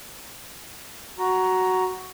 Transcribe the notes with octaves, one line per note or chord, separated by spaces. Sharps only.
F#4 A#5